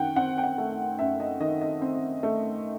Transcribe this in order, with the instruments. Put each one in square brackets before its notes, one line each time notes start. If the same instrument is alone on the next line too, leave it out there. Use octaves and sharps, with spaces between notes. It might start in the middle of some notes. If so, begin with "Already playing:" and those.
Already playing: [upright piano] F#2 D#3 F#5 G5
C4 F#5
G5
F#5
A3
F#2 E5
D#5
D#3 D#5
D#5
C4
A3